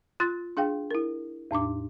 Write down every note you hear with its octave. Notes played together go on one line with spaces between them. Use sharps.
F4 C6 F#6 A6
D4 G#4 F5 G5
E4 A#4
E2 A2 D4 D6